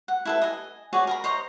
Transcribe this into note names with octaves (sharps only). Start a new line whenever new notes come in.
F#5
E4 A4 B4
D#5 G#5
F#4 G#4 C#5 D5
A#4 A#5 B5
C5 C#5 D#5 A#5